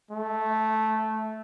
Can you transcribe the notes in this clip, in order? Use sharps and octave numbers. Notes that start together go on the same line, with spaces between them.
A3